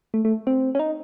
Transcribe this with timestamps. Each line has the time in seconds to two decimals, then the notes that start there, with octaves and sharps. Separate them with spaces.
0.14 A3
0.25 A3
0.47 C4
0.75 C#4
0.79 D#4